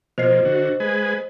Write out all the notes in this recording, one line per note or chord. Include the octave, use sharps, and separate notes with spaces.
B2 F3 A#3 C5 D#5 C7
D3 F#4
G#3 B4 G#5